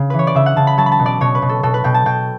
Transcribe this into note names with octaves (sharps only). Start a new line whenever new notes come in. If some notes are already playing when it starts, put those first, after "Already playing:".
Already playing: C#3
E3 B4
C#5
D5
C#3 E5
F#5
C#3 A5
B5
F#3 A5
B5
A5
B2
D5
B2 C#5
B4
B2
A4
B2 A4
B4
B2 G5
A5
B2 G5